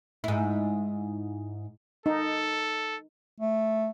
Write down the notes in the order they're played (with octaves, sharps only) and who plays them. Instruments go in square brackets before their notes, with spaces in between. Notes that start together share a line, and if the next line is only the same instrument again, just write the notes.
[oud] G#2 E4
[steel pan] D#4 [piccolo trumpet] A4
[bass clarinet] A3